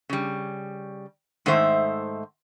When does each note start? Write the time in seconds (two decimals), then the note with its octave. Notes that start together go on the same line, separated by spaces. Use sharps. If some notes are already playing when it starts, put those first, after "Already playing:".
0.09 C#3 G3
1.46 G#2 D#3 A3 C5 E5